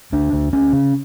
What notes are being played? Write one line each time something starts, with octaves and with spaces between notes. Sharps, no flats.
D2 D4
D2
D2 C#4
C#3